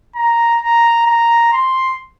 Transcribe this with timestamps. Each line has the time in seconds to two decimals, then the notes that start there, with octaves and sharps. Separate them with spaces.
0.15 A#5
0.61 A#5
1.07 A#5
1.53 C6